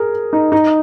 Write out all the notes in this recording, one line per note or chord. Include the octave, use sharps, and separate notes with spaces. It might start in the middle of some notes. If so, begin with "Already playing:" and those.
Already playing: G#4 A#4
D#4
D#4